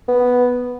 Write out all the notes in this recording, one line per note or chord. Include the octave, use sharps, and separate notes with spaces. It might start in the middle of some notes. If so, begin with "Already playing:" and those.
B3